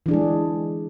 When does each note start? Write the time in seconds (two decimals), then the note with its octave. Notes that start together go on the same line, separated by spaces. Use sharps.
0.06 E3
0.08 D4
0.11 G#4
0.14 G#3